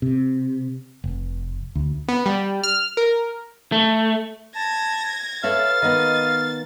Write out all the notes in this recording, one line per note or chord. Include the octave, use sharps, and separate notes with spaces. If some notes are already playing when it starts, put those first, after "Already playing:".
C3
F1
D2
B3
G3
F6
A#4
A3
A5 G#6 A#6
A4 B4 C#5 E5 F5 A6
D#3 B3 D#5